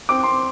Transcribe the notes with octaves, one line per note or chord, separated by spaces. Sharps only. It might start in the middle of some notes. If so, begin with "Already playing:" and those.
C4 D6
C6